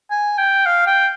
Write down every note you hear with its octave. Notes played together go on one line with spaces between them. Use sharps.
G#5
G5
F5
G5